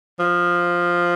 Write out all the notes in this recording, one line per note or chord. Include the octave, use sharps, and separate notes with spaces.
F3